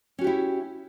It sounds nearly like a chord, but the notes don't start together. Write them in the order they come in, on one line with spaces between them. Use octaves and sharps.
C#4 F#4 G4 E4